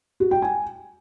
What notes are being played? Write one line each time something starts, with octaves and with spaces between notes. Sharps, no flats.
F#4
G5
G#5